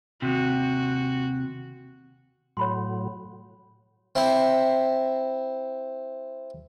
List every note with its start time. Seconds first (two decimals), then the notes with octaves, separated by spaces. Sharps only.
0.22 D#2 C3 F#4
2.57 A2 F#3 C#5 B5 C6
4.15 C4 E4